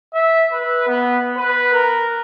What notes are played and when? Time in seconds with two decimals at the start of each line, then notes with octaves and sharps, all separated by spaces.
0.14 E5
0.53 B4
0.87 B3
1.37 B4
1.73 A#4